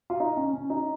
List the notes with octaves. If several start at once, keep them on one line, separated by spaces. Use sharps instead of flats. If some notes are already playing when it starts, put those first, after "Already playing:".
F4
D#4
C#4
C#4
D#4